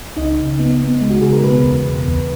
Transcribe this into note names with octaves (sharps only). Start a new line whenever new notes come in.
C#2 D#4 D#5
C#3
B3
B3
G#3
F#4
C#3 G#4
A#4
B2 B3 B4
E2
B2
E2